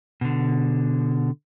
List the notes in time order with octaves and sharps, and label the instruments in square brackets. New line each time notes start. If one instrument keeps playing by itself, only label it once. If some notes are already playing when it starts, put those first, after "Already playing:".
[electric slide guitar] B2 D3